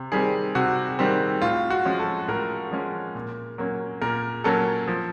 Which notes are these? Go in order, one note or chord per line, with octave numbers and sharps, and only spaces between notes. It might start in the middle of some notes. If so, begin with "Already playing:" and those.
Already playing: C3
D#3 G3 C4 G#4
C3 F#4
D#3 G3 C4
A2 F4
F#4
F3 G#3 C#4
A4
A2 A#4
F3 G#3 C#4
A#2
F#3 A#3 C#4
A#2 A#4
F#3 A#3 C#4 A4
F3